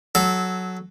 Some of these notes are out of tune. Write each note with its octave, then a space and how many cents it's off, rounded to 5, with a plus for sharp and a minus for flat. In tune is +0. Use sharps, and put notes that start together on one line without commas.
F#3 +0 A4 -20